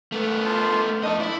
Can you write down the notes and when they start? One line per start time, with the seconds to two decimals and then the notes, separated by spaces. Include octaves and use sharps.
0.12 A3 B3
0.45 F4 C5 A5
1.03 F2 A3 D4 D#4 D#5
1.20 E4 D5 E5